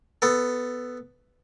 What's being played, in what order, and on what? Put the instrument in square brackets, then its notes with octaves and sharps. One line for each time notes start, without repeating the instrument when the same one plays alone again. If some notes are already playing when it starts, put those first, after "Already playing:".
[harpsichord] B3 A4